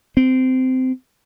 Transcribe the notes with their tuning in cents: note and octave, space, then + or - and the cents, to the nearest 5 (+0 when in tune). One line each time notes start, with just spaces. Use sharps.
C4 -20